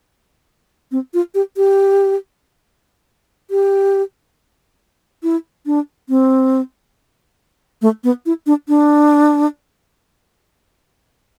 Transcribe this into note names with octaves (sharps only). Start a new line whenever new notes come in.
C4
F4
G4
G4
G4
E4
D4
C4
A3
B3
E4
D4
D4